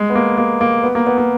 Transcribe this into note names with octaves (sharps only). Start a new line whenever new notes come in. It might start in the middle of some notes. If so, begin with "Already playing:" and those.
Already playing: G#3
B3
A#3
A#3
A#3
B3
A#3
B3
A#3